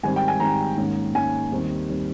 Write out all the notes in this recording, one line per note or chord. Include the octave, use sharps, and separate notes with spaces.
G#2 D#3 G3 C4 G#5
G5
G#5
G#2 D#3 G3 C4 A#5
G#2 D#3 A#3 C#4
G#2 D#3 A#3 C#4 G#5
D#2 D#3 G3 C4
D#3 G3 C4